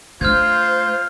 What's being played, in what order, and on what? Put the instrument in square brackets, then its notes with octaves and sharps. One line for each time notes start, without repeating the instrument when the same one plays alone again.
[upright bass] A3 D4 [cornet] F4 [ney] C5 [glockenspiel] F6 G6 G#6